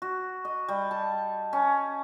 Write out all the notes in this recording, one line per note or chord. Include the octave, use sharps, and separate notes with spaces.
F#4
D#5
G3
A5
C#4